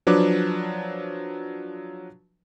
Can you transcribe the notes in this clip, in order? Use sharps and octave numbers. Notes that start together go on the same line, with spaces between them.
F3 F#3 D4 B4 D6